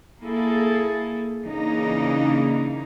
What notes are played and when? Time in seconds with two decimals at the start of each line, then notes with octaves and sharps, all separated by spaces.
0.22 A#3 E4 G#4 A4
1.44 C#3 E3 A#3 D4 D#4